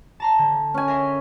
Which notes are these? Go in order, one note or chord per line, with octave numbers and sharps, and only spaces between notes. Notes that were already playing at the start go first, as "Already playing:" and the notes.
A5 A#5 C6
D3
C#4 G#5
A#4 E5 C6